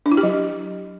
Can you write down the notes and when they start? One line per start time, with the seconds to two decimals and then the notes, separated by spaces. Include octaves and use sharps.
0.06 D4
0.12 E4
0.17 G4
0.23 F#3